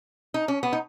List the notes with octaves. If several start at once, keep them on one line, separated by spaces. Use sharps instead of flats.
D#4
C#4
B3
D#4